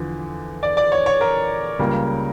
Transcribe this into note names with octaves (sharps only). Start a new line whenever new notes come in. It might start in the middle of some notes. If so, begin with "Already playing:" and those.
Already playing: E2 D3 F3
D5
D5
C#5
C#5
A#4
C#2 C#3 G3 A#3